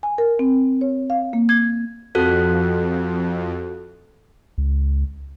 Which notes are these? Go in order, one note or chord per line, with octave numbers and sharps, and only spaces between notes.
G#5
A#4
C4
C#5
F5
A#3
G#6
F2 F#4 A4 F#6
C#2